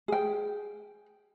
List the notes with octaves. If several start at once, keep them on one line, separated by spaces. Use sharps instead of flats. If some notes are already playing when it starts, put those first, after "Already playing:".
G#4 G5